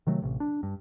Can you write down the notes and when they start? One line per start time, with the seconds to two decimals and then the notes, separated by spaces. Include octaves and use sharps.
0.07 C3 D#3 F#3 A3
0.22 A1 C3
0.40 D4
0.63 G2